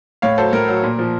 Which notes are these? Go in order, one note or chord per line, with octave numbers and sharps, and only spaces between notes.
A2 C#5 F5
F#3 A4 C5
A2 A#4
F#3
A#2
F3